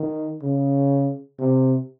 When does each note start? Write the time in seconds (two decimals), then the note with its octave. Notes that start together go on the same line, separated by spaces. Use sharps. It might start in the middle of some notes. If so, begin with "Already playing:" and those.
Already playing: D#3
0.42 C#3
1.39 C3